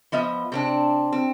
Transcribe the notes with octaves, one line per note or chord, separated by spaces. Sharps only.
F3 B3 D#5 E5
C3 C4 D4
C4